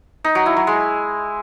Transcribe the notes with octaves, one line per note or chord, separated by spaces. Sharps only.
D#4
F#3
E4
F#3
G#3